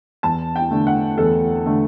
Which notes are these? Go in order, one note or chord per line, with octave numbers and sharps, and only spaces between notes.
E2 A5
G5
D3 A3
F#5
E2 A4
D3 A3